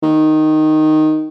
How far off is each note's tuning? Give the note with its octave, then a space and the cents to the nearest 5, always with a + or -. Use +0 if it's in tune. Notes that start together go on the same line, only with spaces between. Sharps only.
D#3 -5